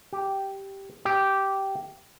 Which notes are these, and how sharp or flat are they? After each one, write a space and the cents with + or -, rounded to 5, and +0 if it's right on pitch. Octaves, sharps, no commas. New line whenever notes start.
G4 -5
G4 -10